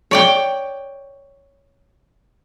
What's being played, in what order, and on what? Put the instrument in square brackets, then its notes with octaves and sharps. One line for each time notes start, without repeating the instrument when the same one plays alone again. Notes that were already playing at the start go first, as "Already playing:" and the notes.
[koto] C#5 D5 G5